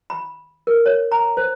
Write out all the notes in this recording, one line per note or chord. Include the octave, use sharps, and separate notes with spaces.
B5
A#4
C#5
A#5
C5